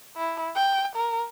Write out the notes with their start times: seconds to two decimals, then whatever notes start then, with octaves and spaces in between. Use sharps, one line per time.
0.17 E4
0.55 G5
0.96 A#4